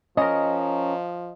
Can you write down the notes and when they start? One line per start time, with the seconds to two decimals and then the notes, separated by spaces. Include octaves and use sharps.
0.17 F3 C#4 A#4 D#5